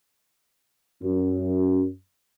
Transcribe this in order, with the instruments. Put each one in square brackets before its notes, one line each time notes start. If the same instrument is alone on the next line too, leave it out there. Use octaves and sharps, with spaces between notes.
[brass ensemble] F#2